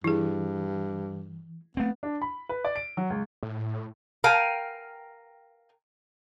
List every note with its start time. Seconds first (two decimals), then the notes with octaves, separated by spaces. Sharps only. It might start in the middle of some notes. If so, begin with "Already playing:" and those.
0.04 G2 E3 E4 G#4
1.77 A3 B3 C4
2.03 D4
2.22 B5
2.49 B4
2.65 D5
2.76 D7
2.97 F#3
3.10 C#2
3.43 A2
4.24 A#4 F5 G5 G#5